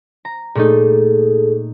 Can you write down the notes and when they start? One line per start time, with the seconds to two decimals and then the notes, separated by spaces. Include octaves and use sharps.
0.25 A#5
0.55 A#2 A3 D#4 G#4 A4